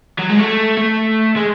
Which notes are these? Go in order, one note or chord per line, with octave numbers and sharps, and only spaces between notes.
F#3
G#3
A3
A3
G#3